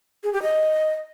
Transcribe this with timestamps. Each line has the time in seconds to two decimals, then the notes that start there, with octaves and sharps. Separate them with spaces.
0.24 G#4
0.33 G4
0.43 D#5